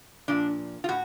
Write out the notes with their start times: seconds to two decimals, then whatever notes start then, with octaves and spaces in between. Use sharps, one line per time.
0.28 A#2 F3 D4
0.84 F4
0.89 A2 F#4